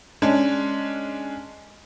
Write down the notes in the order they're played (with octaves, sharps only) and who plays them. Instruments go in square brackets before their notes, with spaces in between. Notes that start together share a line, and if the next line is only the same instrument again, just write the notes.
[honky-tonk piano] G#3 C#4 D4